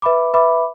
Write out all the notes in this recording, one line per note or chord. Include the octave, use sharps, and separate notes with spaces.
B4 E5 B5 D6
B4 E5 B5 D6